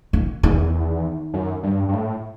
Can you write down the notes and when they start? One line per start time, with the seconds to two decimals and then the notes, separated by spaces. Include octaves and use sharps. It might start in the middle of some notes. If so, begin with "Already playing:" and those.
0.13 D#3
0.43 E2 D#3
1.34 F#2
1.63 G2
1.89 G2
1.94 A2